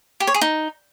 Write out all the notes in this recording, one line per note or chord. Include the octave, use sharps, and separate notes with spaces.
G4
C#5
G#4
D#4